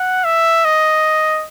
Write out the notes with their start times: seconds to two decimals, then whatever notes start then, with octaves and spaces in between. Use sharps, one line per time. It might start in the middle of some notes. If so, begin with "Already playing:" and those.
Already playing: F#5
0.24 E5
0.65 D#5